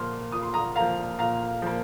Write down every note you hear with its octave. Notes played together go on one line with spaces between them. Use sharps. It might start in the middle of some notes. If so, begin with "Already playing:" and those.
Already playing: A#2 F3 A#3 C6 F6
A#2 D#6
C6
A#5 D#6
F3 A#3 F5 A#5
A#2 F5 A#5
F3 A#3